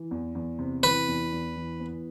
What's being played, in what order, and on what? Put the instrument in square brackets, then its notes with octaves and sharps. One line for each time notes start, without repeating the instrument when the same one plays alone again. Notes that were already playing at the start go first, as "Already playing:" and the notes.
Already playing: [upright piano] E3
E2
E2
C3
[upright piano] E3 [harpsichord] B4
[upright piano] E2
E2
E3
B3